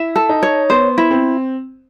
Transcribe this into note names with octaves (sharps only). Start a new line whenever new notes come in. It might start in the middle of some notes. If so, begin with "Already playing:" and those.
Already playing: E4 E5
A4
D#4
C#5
B3 C5
E4
C4